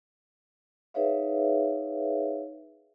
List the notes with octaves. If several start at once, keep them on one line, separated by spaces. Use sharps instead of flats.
D#4 G#4 B4 C#5 E5 F5